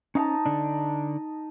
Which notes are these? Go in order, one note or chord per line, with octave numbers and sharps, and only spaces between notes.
C#4 D#4 F5 A5 A#5
D3 D4